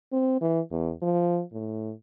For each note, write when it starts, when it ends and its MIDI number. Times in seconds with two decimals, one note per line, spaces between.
0.12 0.37 60
0.41 0.61 52
0.71 0.92 40
1.02 1.42 53
1.53 1.93 45